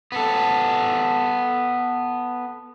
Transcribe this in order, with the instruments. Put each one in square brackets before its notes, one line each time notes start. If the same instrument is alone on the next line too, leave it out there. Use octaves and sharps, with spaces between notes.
[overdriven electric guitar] B3 A4